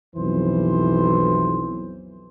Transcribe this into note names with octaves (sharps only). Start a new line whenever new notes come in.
B1 F2 E3 C5